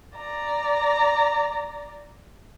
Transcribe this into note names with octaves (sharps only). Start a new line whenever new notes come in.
D5 A#5